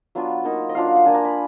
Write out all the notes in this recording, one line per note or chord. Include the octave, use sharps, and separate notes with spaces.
F#3 B3 D4 F4 F5
A#3 D#4
D#5
F#3 D4 F4 F5
F5
F#5
A#3 D4 F4 G#5
A#5
B5